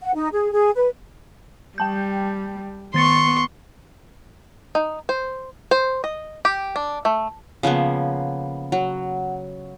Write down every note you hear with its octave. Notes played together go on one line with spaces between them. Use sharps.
F#5
D#4
G#4
G#4
B4
G3 G5 A5 G6
D#3 B3 C6 C#6 A6 C#7
D#4
C5
C5
D#5
G4
D4
A3
C#3 F3 A#3 B3
F#3